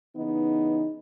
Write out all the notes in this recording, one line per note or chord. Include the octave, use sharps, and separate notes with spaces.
C#3 E3 B3 D#4